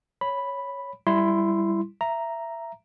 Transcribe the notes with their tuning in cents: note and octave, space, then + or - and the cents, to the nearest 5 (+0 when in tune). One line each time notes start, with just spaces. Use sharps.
C#5 +0 B5 +0
G3 +0 E4 +10 C6 -5
E5 +20 A#5 +0